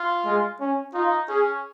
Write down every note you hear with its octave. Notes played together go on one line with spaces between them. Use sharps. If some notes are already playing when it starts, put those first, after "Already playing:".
Already playing: F4
G#3
C#4
D#4 F4
C#4 G#4